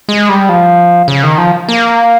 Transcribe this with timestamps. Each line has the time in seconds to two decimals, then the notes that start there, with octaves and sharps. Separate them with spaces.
0.09 G#3
0.29 G3
0.49 F3
1.08 C#3
1.23 D#3
1.38 F3
1.68 A#3